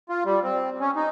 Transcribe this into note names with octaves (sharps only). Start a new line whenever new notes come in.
F4
G3
C4
C#4
D#4